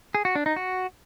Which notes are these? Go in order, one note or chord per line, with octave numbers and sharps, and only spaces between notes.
G#4
F#4
D4
D#4
F#4